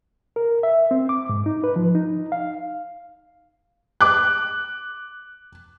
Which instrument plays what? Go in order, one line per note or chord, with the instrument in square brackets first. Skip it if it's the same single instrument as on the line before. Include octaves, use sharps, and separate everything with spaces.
[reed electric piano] A#4
E5
C4
D6
G#2
D#4
B4
F3
D#4
F5
[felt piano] D6 F#6